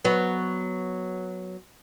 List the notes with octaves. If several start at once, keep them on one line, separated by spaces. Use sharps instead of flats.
F#3 B3